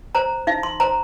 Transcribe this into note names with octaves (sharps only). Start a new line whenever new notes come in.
C5 A#5
D#4 F5
C6
C5 A#5